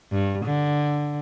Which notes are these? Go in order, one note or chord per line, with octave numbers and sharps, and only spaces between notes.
G2
D3